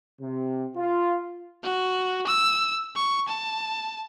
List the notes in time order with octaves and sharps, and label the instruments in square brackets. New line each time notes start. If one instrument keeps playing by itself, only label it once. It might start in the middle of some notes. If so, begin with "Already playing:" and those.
[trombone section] C3
F4
[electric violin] F#4
E6
C#6
A5